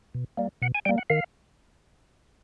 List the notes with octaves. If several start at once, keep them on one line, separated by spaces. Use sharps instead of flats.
B2
G3 A#3
B2 F#5
G#5
G3 A#3 G5
F#5
D#3 F5